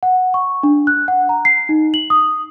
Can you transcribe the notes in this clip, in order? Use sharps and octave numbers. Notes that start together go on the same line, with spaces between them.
F#5
C#6
D4
F#6
F#5
A#5
C7
D#4
F#7
D#6